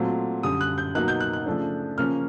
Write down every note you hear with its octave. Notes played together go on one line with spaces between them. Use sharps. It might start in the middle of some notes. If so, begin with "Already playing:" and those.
Already playing: A#2 F#3 A3 C4
F#2 D3 G3 D#6
F#6
G6
B2 F#3 A#3 D#4 F#6
G6
F#6
F#6
C#3 F3 A3 D4
C#3 F3 A#3 C#4 F6